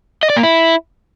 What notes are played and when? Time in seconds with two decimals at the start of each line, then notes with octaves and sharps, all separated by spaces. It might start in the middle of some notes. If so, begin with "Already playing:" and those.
0.23 D#5
0.30 D5
0.37 A#3
0.43 E4